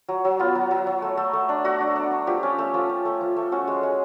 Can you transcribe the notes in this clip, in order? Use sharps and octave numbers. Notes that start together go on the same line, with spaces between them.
F#3
F#3
B3 F4
F#3
F#3
F#3
A3
A3
A3
D4
A3 F#4
D4
D4
D4
F3 G4
C#4
A3
F3
C#4
A3
F3
A3
C#4 F#4
G#3
G#3